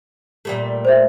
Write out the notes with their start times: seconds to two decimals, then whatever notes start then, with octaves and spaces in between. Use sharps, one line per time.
0.45 A#2 G3 A3
0.85 C5 E5